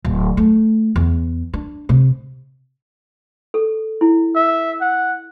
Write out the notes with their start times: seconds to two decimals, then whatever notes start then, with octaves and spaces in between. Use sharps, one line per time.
0.05 D1
0.37 A3
0.96 E2
1.54 D4
1.89 C3
3.54 A4
4.01 E4
4.36 E5
4.81 F#5